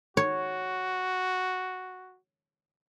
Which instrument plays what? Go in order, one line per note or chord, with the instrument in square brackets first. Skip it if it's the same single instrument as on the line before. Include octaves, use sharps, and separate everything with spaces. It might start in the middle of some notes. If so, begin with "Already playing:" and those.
[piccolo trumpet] F#4 [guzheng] C#5